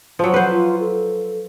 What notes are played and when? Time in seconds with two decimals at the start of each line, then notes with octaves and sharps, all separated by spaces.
0.19 F3 F#3
0.34 B4 C5 F#5
0.51 F4
0.80 A4